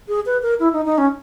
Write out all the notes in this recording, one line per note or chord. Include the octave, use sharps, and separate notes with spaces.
G#4
B4
A#4
E4
D#4
D#4
C#4